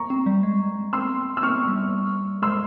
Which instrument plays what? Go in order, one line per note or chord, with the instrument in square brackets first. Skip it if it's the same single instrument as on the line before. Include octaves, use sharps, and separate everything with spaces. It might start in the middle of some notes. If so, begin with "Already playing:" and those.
Already playing: [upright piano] A#5 C#6
[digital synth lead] C4
G3
G#3
[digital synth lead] C4 [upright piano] C6 E6
[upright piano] E6
[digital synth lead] C4 [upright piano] C#6 F6
[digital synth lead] G3
[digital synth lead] G#3 [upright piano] C6 E6